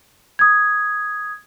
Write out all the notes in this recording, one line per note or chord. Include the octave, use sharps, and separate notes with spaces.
D#6 G#6